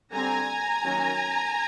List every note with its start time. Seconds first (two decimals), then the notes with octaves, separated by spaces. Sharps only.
0.12 D3 G3 C4 G#5 A#5
0.82 D#3 F#3 A#3 C#4